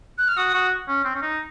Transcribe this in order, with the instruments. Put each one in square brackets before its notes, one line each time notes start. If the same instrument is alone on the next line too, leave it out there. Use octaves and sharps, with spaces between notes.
[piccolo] F#6
F6
[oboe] F#4 [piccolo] D#6
[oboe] F#4
C#4
C4
C#4
D#4